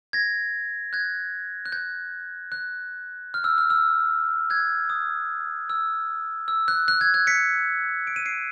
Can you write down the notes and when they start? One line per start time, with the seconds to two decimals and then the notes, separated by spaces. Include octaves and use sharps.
0.13 G#6 A#6
0.93 F#6 G#6
1.66 F#6
1.72 G6
2.52 F#6
3.34 F6
3.44 E6
3.58 F6
3.70 E6
4.50 F#6 G#6
4.90 D#6
5.70 E6
6.48 E6
6.68 F#6
6.88 F#6
7.01 F#6 G#6
7.14 F#6 G#6
7.27 B6 C#7
8.07 D7
8.16 D#7
8.26 C7 D7